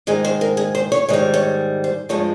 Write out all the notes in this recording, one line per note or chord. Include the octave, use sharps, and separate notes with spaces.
G#2 D#3 G#3 G#4
C5
A#4
G#4
C5
C#5
G#2 D#3 G3 C#5
C#5
C5
G2 F3 G#3 C#5